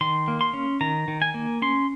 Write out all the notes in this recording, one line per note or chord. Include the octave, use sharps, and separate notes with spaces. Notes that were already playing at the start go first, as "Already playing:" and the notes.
D#3 C6
A#3
C6
C#4
D#3 A#5
D#3
G#5
A#3
C#4 C6